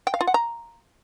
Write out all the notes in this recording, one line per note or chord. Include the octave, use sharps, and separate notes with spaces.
G5
F5
F4
F#5
A#5